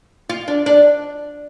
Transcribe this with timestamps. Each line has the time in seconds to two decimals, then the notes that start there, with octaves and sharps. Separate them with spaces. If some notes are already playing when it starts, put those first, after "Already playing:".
0.29 F4
0.48 D4
0.66 D4